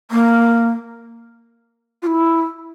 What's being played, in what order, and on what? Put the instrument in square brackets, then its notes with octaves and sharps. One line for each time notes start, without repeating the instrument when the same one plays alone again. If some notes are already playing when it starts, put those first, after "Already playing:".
[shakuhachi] A#3
F4
E4